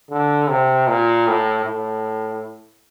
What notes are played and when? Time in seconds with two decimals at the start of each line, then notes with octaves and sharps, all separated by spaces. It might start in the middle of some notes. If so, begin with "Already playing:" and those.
0.11 D3
0.49 C3
0.88 A#2
1.27 A2
1.65 A2